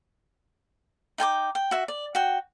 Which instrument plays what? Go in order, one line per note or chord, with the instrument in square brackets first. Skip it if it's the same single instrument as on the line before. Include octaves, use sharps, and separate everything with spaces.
[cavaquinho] D#4 G5 G#5 D6
G5
F#4 E5
D5
F#4 G5